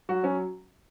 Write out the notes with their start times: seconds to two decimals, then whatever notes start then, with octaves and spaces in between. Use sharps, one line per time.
0.09 F#3 F#4
0.23 F#3 C#4